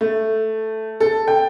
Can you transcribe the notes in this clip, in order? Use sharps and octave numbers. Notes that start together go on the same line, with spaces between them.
A3
A4
G5